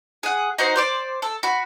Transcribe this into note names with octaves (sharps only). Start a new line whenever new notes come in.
G#4 F#5
D#4 F#4 C5
C5 D5 D6
A4
F#4 B5